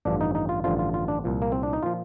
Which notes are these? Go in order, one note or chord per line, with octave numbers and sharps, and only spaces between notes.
A1 G2 D3 F3 D4
D#4
D#4
F4
A1 G2 D3 F3 F4
F4
F4
D4
C2 A#2 F3
A#3
C4
D4
D#4
A#2 F3 F4